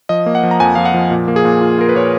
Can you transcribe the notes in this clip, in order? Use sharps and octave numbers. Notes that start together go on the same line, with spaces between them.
F3 D#5
A#3
F#5
F3
A#5
F2 G#5
F2 F5
F#5
F3
A#2
A#3
G#4
A#2
F4
F4 A#4
B4
A#2 C#5